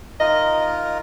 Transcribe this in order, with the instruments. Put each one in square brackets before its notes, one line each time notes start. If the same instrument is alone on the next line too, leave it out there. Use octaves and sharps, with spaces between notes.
[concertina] D#4 F4 A#4 [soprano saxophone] D#5